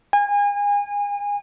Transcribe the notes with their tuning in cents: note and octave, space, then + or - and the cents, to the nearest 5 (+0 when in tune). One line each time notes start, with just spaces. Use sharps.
G#5 -30